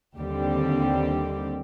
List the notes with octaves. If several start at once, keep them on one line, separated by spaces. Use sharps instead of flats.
D#2 D3 G3 C4 G4